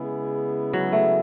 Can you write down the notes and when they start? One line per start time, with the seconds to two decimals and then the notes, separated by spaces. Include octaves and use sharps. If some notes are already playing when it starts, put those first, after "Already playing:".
Already playing: C#3 G#3 B3 E4 G#4
0.73 F#3
0.93 A3